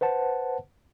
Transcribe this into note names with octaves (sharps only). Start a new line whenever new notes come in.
B4 C5 F#5 A5